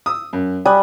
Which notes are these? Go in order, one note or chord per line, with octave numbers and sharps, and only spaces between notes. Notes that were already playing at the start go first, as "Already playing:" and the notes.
D#6 E6
F#2
G3 G#5 D#6 F#6